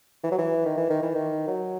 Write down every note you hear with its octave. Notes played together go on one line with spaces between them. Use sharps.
E3
F#3
E3
D#3
E3
D#3
E3
D#3
F#3